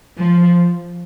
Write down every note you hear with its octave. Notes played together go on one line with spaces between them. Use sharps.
F3